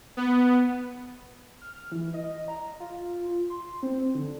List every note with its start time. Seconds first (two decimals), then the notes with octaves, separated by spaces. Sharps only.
0.17 B3
1.62 F6
1.92 E3
2.14 D#5
2.48 A#5
2.80 F4
3.50 C6
3.83 C4
4.15 D3